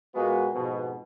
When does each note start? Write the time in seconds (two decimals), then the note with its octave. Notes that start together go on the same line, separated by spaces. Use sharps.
0.14 A#2 G#3 A#3 B3 F#4
0.53 F2 G#2 B2